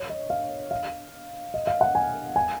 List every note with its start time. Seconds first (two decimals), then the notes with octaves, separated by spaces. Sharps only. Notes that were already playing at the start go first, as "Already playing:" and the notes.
Already playing: C#5
0.10 D#5
0.30 F5
0.71 F5
1.54 D#5
1.67 F5
1.81 F#5
1.95 G#5
2.36 G#5